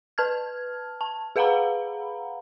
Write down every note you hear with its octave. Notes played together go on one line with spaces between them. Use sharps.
B4 A5 F6 G#6
A5
G#4 B4 F5 F#5 A#5 B5